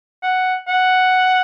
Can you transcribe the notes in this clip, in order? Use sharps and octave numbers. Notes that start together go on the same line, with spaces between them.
F#5
F#5